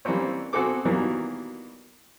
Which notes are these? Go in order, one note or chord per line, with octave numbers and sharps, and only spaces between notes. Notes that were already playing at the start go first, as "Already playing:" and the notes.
E3 G3 A#3 C4 C#4
B2 C4 F#4 G#4 A4 D6
B2 D#3 E3 F#3 G3 A#3